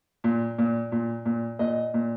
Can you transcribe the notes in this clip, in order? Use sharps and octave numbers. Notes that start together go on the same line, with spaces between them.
A#2
A#2
A#2
A#2
A#2 D#5
A#2